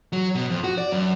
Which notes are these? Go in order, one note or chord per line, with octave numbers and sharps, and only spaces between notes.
F#3
B2
F2
F#4
D5
F#2